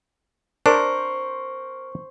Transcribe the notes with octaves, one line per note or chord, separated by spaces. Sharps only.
D4 A#4 C5 C#6